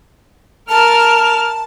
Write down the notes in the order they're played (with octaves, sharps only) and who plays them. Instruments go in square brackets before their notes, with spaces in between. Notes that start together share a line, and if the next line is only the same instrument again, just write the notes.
[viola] A#4 [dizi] A5 [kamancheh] F6